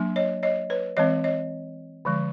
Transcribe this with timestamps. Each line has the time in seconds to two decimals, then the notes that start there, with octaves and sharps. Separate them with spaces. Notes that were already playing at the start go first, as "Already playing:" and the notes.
Already playing: F#3 A#3 D4
0.16 C#5 D#5
0.43 C#5 D#5
0.70 B4 C#5
0.97 E3 G#3 C4 C#5 D#5
1.24 C#5 D#5
2.05 D3 F3 G#3